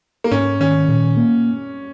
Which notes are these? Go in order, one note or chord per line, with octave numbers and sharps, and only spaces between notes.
A#3
G#2 C#4
D#3 C#4
A#2
A#3